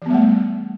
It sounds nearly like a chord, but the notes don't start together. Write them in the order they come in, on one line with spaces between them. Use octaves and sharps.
E3 B3 G3 A3